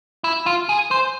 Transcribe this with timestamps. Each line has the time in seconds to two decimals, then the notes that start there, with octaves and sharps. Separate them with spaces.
0.24 E4
0.46 F4
0.69 G#4
0.91 C5